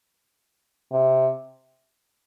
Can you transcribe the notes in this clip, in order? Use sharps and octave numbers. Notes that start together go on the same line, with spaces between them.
C3